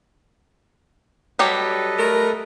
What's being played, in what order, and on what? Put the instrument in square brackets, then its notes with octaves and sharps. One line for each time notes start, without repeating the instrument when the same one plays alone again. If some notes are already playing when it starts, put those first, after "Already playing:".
[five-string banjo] F#3 G3 G4 [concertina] A4 B4 D#5
[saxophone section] A3 A#4